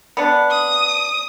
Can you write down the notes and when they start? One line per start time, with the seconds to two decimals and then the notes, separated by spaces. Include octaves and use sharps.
0.17 B3 D4
0.51 D#6